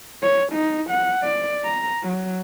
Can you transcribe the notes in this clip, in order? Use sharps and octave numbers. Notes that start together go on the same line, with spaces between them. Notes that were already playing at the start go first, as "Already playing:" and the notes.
C#5
D#4
F#5
D5
A#5
F#3